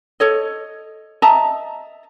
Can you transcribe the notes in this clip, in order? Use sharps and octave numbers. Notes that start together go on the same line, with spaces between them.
A4 C#5 D#5
D#5 E5 A5 A#5